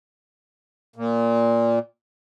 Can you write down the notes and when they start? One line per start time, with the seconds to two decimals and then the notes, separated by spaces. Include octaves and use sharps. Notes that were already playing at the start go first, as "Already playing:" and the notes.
0.96 A#2